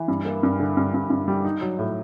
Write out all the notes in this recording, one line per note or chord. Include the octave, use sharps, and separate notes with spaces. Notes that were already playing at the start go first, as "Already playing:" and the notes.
Already playing: E3
G2
A#3
G2
D3
G2
G2
G2
G3
D#4
F#3
A2